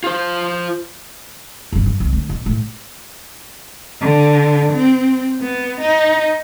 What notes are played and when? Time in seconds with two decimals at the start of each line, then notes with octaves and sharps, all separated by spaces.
0.04 F4 C5
1.72 G1 G2
1.86 F#2
2.00 C2
2.13 D2
2.29 B2
2.46 A2
4.02 D3
4.73 C4
5.42 B3
5.81 D#4